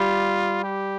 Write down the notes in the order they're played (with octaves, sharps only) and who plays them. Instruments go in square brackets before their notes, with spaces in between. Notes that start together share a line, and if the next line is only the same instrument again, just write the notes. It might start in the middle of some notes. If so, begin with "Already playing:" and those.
Already playing: [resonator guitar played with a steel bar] G3 [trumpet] F4
[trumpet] G4